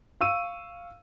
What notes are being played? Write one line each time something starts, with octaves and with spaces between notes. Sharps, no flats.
F5 C#6 E6 D#7